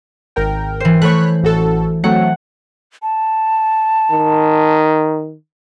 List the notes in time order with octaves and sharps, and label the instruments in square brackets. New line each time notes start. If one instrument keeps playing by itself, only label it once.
[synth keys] G#1 A#4 G5
[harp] E3 C5
[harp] A3 [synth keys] C#5 B5 F#6
[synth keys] A1 F#4 A4
[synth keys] F#3 A3 C4 [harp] F#5
[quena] A5
[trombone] D#3